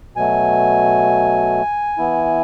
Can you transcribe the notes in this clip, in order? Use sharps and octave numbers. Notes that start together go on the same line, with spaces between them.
B2 F#3 A3 G#5
E3 B3 E4